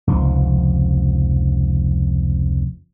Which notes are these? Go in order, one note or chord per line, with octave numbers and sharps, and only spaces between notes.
F1 C#2 F3